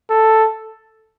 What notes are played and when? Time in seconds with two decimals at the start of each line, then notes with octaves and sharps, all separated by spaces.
0.10 A4